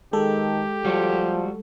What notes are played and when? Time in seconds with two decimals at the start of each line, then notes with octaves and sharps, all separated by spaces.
0.13 D#3 G#3 G4 A4
0.85 F3 G3 F#4